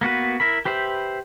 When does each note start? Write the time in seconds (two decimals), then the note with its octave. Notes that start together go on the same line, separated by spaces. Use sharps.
0.01 A#3 B3 F#4 B4
0.40 E4 A#4 B5
0.65 G4 B4 C5 E5 B5